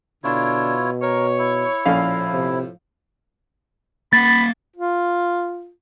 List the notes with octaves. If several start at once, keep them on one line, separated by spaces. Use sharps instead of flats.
B2 D3 D4 E4 F4 C#5
A#4 C#5
E4
A#1 A2 F3 C#4 F5
C3
A#3 F#5 B5 A6
F4